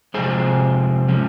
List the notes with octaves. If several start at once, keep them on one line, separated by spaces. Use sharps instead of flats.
C3 F3 G#3 G#4 C5
F3 G#3 C#4